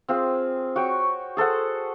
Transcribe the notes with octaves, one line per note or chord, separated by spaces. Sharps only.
C4 F4 G#4
F#4 C#5 G5 C#6
G#4 A4 C5 F#5